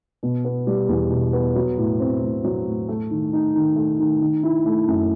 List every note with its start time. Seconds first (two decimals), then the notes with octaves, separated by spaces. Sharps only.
0.23 B2
0.45 B3
0.67 G3
0.89 E2
1.11 B2
1.33 B3
1.56 F#3
1.78 A2
2.00 C4
2.22 A2
2.44 F#3
2.66 A2
2.89 A3
3.11 D#3
3.33 D#4
3.55 D#3
3.76 A3
4.00 D#3
4.21 D#3
4.43 E4
4.66 A3
4.88 F#2